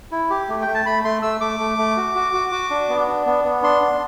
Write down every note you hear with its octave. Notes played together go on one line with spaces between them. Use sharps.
E4
G4
A3
G5
A3
A5
A3 B5
A3 C6
A3 E6
A3 D6
A3
A3
F#4
F#4
F#4
F#4
D4
B3
D4
B3
B3
D4 C6
D4